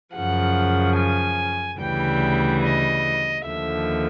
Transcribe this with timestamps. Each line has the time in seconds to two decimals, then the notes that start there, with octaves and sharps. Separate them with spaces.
0.14 F#2 C#3 F3 F#5
0.97 G#5
1.79 D2 C#3 E3 G3 G5
2.62 D#5
3.44 D#2 D3 F3 E5